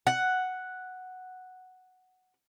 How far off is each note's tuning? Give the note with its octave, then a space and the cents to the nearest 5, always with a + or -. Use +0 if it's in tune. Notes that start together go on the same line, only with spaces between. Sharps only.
F#5 +0